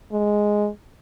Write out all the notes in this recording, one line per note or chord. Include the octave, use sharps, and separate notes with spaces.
G#3